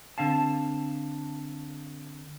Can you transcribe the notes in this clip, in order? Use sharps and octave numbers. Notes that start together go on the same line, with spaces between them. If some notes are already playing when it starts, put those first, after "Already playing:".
D3 C4 F5 A5